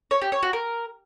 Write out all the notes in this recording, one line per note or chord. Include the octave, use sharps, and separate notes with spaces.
C#5
G4
C#5
F#4
A#4